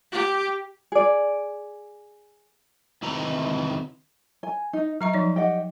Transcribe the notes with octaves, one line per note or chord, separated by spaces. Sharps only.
G4
G#4 D5
C3 D#3 E4 B4 A#5
G#5
D#4
F#3 E5 A#5 C#6
F3 D#4 D5
G4 D#5 F#5